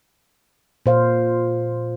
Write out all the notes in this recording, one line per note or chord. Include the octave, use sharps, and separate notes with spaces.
A#2 C5 F5